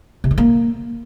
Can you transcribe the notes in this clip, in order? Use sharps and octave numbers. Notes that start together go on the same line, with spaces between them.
C3
D#3
A#3